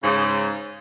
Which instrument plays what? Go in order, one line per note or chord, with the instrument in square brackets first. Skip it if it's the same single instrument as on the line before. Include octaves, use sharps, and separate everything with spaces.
[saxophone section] G#2 C#3